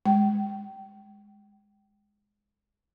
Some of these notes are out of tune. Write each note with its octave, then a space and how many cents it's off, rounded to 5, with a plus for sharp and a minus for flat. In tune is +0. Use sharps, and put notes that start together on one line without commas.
G#3 -10 G5 -25